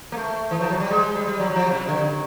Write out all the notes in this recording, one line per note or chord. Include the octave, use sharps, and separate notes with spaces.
A#3
A3
E3
F3
F#3
G3
G#3
G3
G3
F#3
F#3
F3
C3
D3